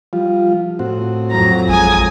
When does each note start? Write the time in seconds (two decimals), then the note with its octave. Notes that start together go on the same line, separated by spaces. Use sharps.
0.13 F3 G3 F4
0.79 A2 C4 F#4
1.31 F2 F#3 A#5
1.68 A1 G#3 G#5 D#6